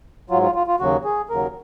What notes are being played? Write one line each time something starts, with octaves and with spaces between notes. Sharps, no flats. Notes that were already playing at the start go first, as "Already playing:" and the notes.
G#2 F#3 F4
F4
F4
F4
D#2 C#3 F#3 F#4
G#4
D#2 C#3 F#3 A#4